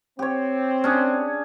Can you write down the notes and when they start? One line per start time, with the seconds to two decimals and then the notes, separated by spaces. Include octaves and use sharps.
0.19 C4 G4 C#5
0.84 C#4 D4 G#4